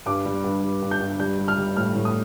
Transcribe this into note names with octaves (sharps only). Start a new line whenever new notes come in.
G2 D6
G3
G2
G2
G2
G6
G2
G3 G6
G3
F6
G3
A2 F6
A2
D#6